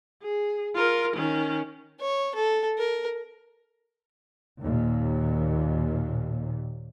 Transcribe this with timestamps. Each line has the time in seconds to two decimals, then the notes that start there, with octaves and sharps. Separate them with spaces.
0.23 G#4
0.75 F4 A#4
1.16 D#3 C#4
2.01 C#5
2.35 A4
2.78 A#4
4.60 D#2 A#2